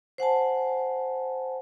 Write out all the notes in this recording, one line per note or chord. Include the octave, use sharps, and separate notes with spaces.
C5 F#5 G#5 A5